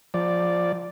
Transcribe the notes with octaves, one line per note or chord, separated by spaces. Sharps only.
F3 D5